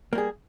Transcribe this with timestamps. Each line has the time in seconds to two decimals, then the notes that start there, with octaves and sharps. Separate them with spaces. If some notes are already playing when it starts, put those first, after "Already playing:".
0.13 A#3
0.15 G3
0.18 G#4